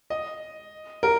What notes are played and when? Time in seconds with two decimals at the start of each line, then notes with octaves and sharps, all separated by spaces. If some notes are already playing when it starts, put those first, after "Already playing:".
0.10 D#5
1.03 A#4